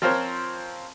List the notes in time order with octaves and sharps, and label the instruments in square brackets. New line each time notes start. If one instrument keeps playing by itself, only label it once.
[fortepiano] F3 C4 F4 A#4 C5 C#5